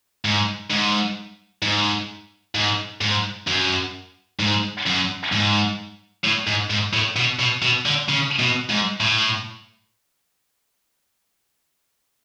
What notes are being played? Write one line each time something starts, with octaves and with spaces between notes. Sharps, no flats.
G#2
G#2
G#2
G#2
G#2
F#2
G#2
F#2
G#2
A2
G#2
G#2
A2
B2
B2
B2
D3
C#3
B2
G#2
A2